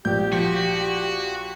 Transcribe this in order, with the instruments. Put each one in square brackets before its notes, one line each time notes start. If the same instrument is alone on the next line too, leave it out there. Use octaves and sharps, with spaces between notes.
[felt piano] A#1 [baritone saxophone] G4 [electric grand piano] G6
[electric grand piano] F3 [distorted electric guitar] F#4